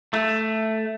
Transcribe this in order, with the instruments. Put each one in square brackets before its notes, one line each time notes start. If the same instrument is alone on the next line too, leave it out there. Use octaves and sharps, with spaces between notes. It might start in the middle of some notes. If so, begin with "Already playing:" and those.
[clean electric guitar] A3